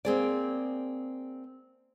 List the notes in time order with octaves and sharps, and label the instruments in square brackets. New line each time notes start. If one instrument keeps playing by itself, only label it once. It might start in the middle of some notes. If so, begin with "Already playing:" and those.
[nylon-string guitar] A#3 C4 G#4 D5